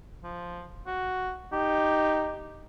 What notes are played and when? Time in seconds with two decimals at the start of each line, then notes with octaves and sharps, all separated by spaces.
0.24 F3
0.87 F#4
1.53 D#4 G4